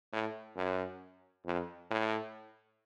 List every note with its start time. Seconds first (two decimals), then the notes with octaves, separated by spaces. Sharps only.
0.13 A2
0.56 F#2
1.46 F2
1.90 A2